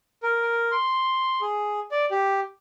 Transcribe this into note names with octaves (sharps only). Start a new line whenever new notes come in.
A#4
C6
G#4
D5
G4